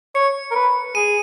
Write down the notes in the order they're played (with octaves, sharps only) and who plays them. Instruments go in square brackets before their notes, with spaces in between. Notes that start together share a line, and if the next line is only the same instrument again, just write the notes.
[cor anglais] C#5 [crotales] C#7
[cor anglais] A#4
B4
[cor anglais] G#4 [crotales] D#7